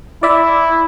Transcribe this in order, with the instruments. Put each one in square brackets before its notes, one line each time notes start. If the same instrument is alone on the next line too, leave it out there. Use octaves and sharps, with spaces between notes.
[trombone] E4 [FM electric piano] D5 E5